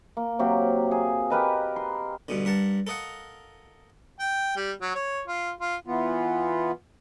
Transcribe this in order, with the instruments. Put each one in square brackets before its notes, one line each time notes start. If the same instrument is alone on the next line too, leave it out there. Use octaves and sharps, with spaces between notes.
[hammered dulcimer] A#3
C3 F#3 A#3 G4
G#4
G4 A#4 B4 D#5
C6
[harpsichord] G2 B2 D3
G2 A#4 F#5 A5
A4 A#4 D#5 F5 F#5
[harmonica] G5
G3
F#3
C#5
F4
F4
[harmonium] E3 B3 F4